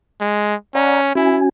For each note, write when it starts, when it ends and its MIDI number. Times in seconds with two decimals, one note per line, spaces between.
0.21 0.55 56
0.75 1.14 61
0.75 1.01 74
0.75 1.01 78
0.75 1.01 82
1.15 1.49 61
1.15 1.38 64
1.15 1.49 66
1.15 1.49 80